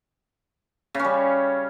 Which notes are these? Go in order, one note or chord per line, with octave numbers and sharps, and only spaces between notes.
C#3 G3 C#4